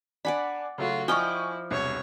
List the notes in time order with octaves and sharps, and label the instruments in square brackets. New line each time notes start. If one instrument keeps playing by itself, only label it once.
[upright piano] D4 G#5 [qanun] D5 F#5 B5
[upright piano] C#3 F#3 A3 [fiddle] F4 F#4
[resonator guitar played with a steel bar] F3 [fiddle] E4 [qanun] D5 D#5 G5 [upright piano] G#5 C#6
[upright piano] E1 C2 [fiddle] C#5